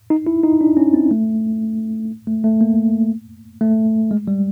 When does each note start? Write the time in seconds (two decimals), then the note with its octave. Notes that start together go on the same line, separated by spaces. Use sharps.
0.10 D#4
0.27 E4
0.43 D#4
0.61 D4
0.77 C#4
0.94 C4
1.11 A3
2.27 A3
2.44 A3
2.61 A#3
3.61 A3
4.11 G#3
4.28 G3